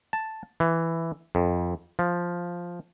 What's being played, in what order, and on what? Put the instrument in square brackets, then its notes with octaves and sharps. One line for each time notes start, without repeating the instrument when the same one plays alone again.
[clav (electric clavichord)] A5
E3
F2
F3